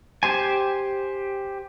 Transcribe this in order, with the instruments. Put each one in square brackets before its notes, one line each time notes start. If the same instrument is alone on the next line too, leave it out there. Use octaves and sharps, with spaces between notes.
[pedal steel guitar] G4 C5 G#5